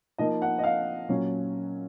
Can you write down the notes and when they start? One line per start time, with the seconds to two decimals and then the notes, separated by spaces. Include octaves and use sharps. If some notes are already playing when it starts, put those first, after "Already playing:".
0.18 F3 A#3 D#4 D#5
0.42 F#5
0.58 D#5
0.64 F5
1.09 A#2 F#3 C#4